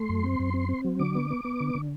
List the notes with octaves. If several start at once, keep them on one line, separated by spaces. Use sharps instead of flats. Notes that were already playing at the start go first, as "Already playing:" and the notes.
Already playing: A3 C6
F#2
C4
F#2
C4
C4
F#3
D3 D6
B3
B3
B3
D3
D3